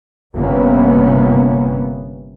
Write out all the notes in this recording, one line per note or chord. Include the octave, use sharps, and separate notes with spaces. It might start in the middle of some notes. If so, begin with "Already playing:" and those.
G1 C3 A#3 B3 C#4